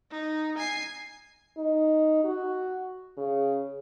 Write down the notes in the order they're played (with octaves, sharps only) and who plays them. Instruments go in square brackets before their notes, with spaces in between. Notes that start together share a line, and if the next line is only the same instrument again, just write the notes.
[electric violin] D#4
G#5 C7
[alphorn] D#4
F#4
C#3